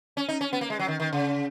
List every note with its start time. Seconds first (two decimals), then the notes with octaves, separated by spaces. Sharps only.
0.17 C#4
0.28 D#4
0.41 C#4
0.53 B3
0.61 A#3
0.70 G#3
0.79 F#3
0.88 D#3
1.00 D#3
1.13 C#3